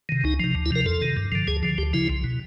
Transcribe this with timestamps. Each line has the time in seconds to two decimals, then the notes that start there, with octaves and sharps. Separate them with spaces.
0.09 C3 D#3
0.24 C#2 D#4
0.40 C3 F3
0.55 D2
0.66 E4
0.71 C3 F3 A#4
0.86 F2 A4
1.01 C3 D#3
1.17 G2
1.32 D3 F3
1.47 D2 G#4
1.63 D3 F3
1.78 D2 G4
1.93 C#3 F3 E4
2.10 C2
2.24 B2